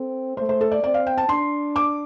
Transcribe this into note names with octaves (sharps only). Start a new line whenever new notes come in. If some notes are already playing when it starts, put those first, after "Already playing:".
Already playing: C4 A4
A3 C5
C5
A4
D5
C4 D5
F5
G5
A5
D4 C6
D6